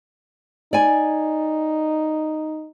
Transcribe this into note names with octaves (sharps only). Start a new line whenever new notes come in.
D#4 D5 G#5